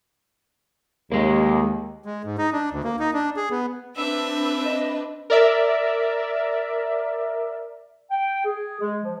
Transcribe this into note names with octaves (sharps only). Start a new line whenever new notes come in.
D#2 G#3 A#3
G#3
G#2
D#4
D4
D2
A#3
D#4
D4
G#4
B3
C4 D4 B4 E5 E6
D#5
A#4 D5 E5
G5
G#4
G#3
F3